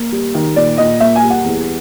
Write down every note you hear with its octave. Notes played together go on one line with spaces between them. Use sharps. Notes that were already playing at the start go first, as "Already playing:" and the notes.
Already playing: A#3
G3
D#3
A#2 D5
A#2 D#5
A#3 E5
G#5
G3
F#5
E2